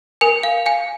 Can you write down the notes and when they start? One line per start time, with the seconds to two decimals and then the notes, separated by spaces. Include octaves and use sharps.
0.21 A#4 G#5
0.43 F5
0.66 F5 G#5